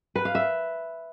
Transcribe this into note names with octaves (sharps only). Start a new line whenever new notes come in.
B4
F5
E5